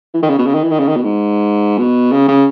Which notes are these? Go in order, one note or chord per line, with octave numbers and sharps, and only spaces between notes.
E3
D#3
C#3
B2
C#3
D#3
E3
D#3
C#3
D#3
B2
G#2
B2
C#3
C#3